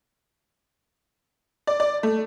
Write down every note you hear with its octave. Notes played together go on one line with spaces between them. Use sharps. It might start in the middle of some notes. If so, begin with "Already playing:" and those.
D5
D5
A3